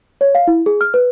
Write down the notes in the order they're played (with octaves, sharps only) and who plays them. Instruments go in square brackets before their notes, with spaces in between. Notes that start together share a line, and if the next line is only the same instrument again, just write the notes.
[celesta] C#5
F5
E4
G#4
F6
B4